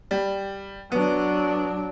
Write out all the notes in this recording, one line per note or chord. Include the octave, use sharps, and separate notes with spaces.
G3
F#3 B3 D4